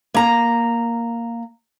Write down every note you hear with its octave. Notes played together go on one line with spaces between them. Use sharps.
A#3 A#5